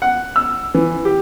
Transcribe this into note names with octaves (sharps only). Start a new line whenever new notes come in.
F#5
E6
E3
G4